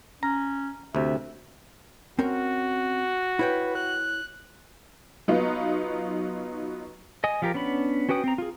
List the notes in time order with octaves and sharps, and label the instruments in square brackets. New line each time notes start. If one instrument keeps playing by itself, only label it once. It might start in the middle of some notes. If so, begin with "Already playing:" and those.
[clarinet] C#4 [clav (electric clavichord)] A#5
[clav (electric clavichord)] D2 C3 [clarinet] E5
[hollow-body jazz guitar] C4 C#4 A#4 [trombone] F#4
[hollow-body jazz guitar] E4 C#5 G5 [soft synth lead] B4
[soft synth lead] F#6
[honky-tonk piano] F#3 B3 D#4 F4
[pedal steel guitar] D#5 G#5 D#6
F3 F4 G4 G#4 A#4
B3 C#4 D4 B5
C#4 F#4 B4 G5 D#6
C4 A#5
F4 G#4